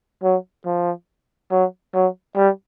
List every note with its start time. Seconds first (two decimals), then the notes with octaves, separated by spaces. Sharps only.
0.23 F#3
0.66 F3
1.51 F#3
1.94 F#3
2.36 G3